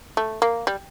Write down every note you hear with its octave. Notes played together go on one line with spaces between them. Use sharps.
A3
A#3
G3